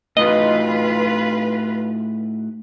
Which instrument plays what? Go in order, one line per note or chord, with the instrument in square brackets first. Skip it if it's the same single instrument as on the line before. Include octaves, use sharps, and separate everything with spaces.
[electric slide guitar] A2 D#4 F#4 [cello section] F4 B4 [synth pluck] D#5